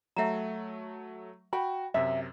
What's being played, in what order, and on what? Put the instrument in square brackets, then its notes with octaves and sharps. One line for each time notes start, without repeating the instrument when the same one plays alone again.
[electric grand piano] F#3 A3 [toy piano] E5 F#5 A#5
[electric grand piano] F#4 [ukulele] G5 B5
[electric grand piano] F#2 C3 [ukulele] E5